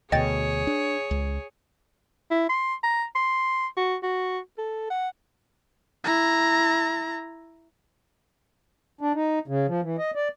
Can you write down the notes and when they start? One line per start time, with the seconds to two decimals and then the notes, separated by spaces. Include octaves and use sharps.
0.12 D2 B2 G#4 C#5 D#5 G5 A6
0.67 D4
1.11 C#2
2.31 E4
2.49 C6
2.83 A#5
3.15 C6
3.77 F#4
4.03 F#4
4.58 A4
4.90 F#5
6.04 E4 A#5
9.01 D4
9.15 D#4
9.48 C#3
9.68 F3
9.82 E3
9.99 D#5
10.15 D5